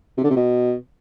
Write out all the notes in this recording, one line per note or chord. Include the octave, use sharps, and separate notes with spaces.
C3
D3
C3
B2